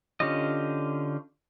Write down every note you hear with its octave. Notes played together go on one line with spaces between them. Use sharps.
D3 C#4 F4 G4 D#5